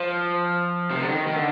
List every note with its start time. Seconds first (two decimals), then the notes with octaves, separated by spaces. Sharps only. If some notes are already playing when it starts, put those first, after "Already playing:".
Already playing: F3
0.90 C3
1.00 D3
1.08 D#3
1.27 D#3
1.35 D3